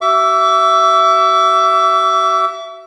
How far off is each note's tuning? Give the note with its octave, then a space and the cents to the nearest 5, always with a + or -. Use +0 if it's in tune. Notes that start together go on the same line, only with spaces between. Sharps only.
F#4 +40 E5 +10 D6 -40